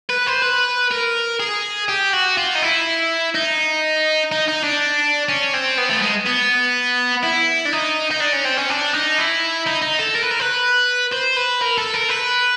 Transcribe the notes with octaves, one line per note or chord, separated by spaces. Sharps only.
B4
C5
B4
A#4
G#4
G4
F#4
F4
D#4
E4
D#4
D#4
D#4
D4
C#4
C4
B3
A3
G#3
B3
E4
D4
D#4
D#4
D4
C#4
C4
C#4
D4
D#4
E4
D#4
D#4
A4
A#4
B4
A#4
B4
C5
B4
A#4
A4
A#4
B4